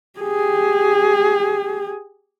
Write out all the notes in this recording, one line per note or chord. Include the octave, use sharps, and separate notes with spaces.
G4 G#4